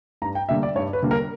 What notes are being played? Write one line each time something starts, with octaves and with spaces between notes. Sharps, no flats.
G2 A#5
G5
D3 G3 A#3 E5
D5
G2 C#5
B4
D3 G3 A#3
A#4